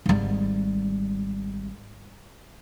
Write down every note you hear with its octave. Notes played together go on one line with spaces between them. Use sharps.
G#1 G3